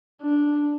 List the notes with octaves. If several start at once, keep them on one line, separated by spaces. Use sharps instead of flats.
D4